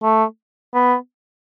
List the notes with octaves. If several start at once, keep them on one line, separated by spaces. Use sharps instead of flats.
A3
B3